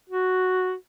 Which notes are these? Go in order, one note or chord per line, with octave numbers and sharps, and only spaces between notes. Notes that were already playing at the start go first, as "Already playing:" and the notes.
F#4